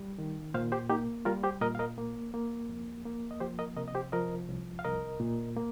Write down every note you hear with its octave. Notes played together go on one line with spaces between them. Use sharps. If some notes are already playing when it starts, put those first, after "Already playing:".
Already playing: G3
D#3
A#2 C5 F5
G4 C5
A#3 D#4 G4
G3 F4 A#4
G4 C5
A#2 A#4 D#5
F5
A#4 D#5
A#3
A#3
F2
A#3
D#5
F3 G4 C5
A#4 D#5
C3 A#4 D#5
D#5
G4 C5
F3 A#4 D#5
C2
F5
C2 A#4 D#5
A#2
A#3